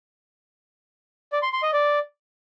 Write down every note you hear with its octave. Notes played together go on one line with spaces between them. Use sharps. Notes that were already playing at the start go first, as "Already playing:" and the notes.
D5
C6
C6
D#5
D5